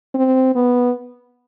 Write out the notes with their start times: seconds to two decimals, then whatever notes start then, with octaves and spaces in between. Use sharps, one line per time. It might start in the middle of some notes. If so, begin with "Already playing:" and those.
0.15 C4
0.56 B3